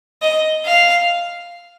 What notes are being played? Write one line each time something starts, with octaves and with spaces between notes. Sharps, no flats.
D#5
F5